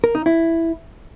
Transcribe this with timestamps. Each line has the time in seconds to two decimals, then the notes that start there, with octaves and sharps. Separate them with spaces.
0.04 A#4
0.15 D#4
0.26 E4